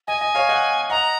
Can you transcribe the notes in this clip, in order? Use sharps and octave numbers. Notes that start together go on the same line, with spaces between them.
D#5 G#5
D#5
C#5 F5
D#5 F#5
D#5 F#5 A#5